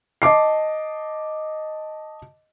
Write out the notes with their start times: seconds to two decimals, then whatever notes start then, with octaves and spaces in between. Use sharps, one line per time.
0.22 D#5 A5 D6 C7